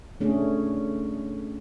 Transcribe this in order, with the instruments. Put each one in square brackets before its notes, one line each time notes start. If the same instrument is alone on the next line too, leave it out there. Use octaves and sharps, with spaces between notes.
[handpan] A3 C#4 D4 G#4